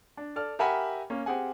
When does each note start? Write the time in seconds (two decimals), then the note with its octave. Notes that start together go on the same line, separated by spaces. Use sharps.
0.17 D4
0.36 A4 D5 F6
0.59 G4 A#4 E5 F#5 G#5 B5
1.10 A#3 C#4
1.26 C4 G4 G#4 F#5 G#5